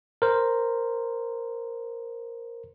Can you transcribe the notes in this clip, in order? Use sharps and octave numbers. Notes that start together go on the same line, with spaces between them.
A#4 C5